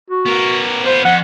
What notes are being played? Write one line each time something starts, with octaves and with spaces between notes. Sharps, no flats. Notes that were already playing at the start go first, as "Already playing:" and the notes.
F#4
B3 A#4
B3 F4 C5
F2 F#5